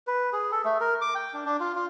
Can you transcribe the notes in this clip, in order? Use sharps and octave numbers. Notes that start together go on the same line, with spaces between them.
B4
G#4
A4
A3
A#4
D6
G5
D4
D4
F4
F4